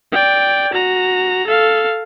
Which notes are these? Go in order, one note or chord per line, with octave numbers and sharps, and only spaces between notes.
D5 G5
F#4 A#5
A4 F5